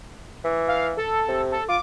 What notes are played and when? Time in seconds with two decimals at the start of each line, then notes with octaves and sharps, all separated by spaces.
0.44 E3
0.68 F5
0.97 A4
1.28 C3
1.52 A4
1.69 F4 D6